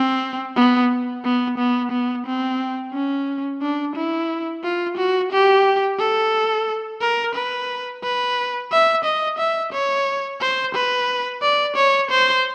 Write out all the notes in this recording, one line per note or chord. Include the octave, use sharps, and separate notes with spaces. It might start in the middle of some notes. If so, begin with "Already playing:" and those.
Already playing: C4
B3
B3
B3
B3
C4
C#4
D4
E4
F4
F#4
G4
A4
A#4
B4
B4
E5
D#5
E5
C#5
C5
B4
D5
C#5
C5